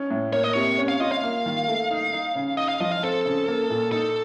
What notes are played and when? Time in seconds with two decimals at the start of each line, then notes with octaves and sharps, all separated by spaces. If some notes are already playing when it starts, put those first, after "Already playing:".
Already playing: C#4 D#4
0.10 A2
0.33 A#3 C#5
0.44 D#5
0.53 C3 C#5
0.78 C#4
0.88 F5
1.00 F4 D#5
1.12 F5
1.23 A#3
1.46 D#3
1.68 A3
1.90 D#4
2.13 D#4
2.35 C#3
2.57 D#4 D#5
2.69 F5
2.80 F3 D#5
2.92 F5
3.03 C4 A4
3.25 C#3
3.48 A#3
3.70 A#2
3.92 D#4 A4